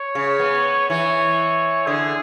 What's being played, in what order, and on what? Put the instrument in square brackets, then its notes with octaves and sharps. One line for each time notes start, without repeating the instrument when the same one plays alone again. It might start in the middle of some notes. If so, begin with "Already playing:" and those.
Already playing: [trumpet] C#5
[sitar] C#3
B3
[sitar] E3 [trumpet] C#5
[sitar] D3 [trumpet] G#4